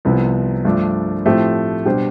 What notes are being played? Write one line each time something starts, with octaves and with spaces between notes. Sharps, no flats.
C2 C3 F3 B3
G2 F3 A3 D4
A2 F3 A3 C4 G4
B2 G3 D4 G4 C5